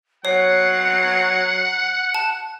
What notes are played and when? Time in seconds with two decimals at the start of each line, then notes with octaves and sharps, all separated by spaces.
0.25 F#3 C#5 F#5 C7
2.15 A5